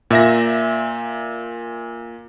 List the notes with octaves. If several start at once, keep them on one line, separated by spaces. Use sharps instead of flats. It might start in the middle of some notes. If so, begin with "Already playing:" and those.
A#2 E5 A#6